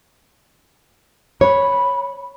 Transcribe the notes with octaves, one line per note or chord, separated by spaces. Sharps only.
C#5 B5